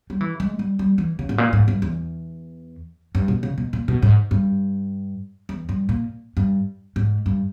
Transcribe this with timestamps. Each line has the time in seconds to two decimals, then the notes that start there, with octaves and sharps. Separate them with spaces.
0.10 G3
0.21 E3
0.40 G#3
0.59 G3
0.79 G3
0.98 E3
1.19 C#3
1.29 G#2
1.38 A#2
1.53 G#2
1.68 G2
1.82 E2
3.15 G2
3.28 B2
3.43 C#3
3.58 B2
3.73 A#2
3.88 B2
4.02 G#2
4.31 G2
5.49 E2
5.69 G2
5.89 A#2
6.37 G2
6.96 G#2
7.26 G2